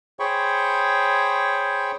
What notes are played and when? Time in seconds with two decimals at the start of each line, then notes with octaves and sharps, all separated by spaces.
0.20 G#4 C5 C#5 G5 B5 C#6